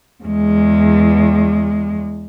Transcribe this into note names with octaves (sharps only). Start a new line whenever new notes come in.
E2 G#3